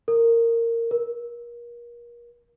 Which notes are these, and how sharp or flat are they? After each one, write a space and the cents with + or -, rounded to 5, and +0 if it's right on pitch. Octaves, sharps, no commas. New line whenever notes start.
A#4 -15
A#4 +35